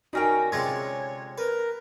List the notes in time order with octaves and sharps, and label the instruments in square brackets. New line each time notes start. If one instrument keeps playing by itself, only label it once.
[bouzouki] D3 C#4 G5 [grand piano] D#4 A#4 [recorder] F#4
[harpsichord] C3 G#3 F4 [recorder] C#5 [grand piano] G#6 A#6
[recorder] A#4 [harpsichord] B4